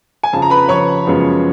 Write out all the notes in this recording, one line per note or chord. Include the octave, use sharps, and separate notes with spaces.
G#5
F2 C#3 F3 A5
A#5
B4 B5
F2 C#3 F3 C#5 C#6
F#2 C#3 F3 G#3 B3